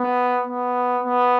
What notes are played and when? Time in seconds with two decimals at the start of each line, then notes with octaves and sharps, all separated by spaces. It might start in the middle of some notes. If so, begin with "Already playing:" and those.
Already playing: B3
0.47 B3
1.03 B3